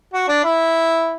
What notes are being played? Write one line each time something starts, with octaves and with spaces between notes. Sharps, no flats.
F#4
D4
E4